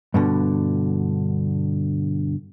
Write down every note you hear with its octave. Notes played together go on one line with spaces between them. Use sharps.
G2 B2 D3